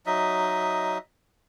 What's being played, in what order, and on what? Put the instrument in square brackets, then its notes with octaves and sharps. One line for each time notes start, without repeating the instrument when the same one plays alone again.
[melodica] F#3 D#4 D#5 E5